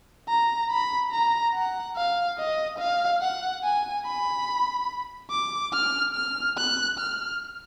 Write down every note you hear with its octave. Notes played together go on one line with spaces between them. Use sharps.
A#5
B5
A#5
F#5
F5
D#5
F5
F#5
G#5
B5
D6
F6
F6
F#6
F6